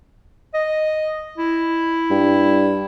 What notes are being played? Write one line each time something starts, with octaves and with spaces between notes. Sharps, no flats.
D#5
E4
G2